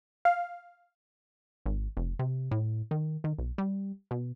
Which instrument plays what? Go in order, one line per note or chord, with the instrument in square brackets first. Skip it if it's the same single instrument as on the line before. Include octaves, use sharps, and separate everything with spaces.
[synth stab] F5
[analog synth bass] G#1
F1
C3
A2
D#3
D#3
B1
G3
B2